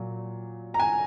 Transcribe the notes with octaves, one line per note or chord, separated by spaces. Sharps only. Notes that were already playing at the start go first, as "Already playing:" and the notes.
Already playing: A#2 F#3
A#5
G#5